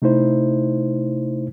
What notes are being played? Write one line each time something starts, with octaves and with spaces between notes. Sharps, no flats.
C3 A3 D#4 E4 C5